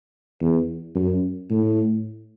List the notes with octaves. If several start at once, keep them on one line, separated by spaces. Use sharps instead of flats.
E2
F#2
A2